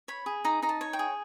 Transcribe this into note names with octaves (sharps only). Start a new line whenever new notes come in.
C#5 B5
G#4
D#4 A#5
D#4 A#5
A5
C#5
G5
G#4